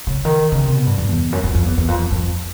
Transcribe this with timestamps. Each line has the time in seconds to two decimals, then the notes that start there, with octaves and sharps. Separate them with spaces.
0.07 C#3
0.25 D#3
0.52 C#3
0.64 C3
0.75 B2
0.86 G2
0.98 F2
1.09 E2
1.32 F#2
1.44 F2
1.54 F2
1.66 E2
1.78 E2
1.88 F2
2.00 F2
2.11 F2